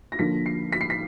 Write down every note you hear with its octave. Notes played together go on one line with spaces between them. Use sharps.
A#6
D3 F3 A#3 B6
C7
B6
C7
B6